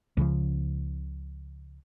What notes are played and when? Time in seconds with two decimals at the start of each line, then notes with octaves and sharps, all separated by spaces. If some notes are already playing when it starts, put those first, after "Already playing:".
0.17 C#2 C#3 E3 F3